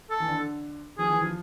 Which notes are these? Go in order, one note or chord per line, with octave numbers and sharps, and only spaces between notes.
A4
E3
D3
F3 G#4
E3
F3